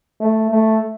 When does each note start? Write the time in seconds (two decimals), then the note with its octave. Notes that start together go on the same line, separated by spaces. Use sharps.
0.20 A3
0.50 A3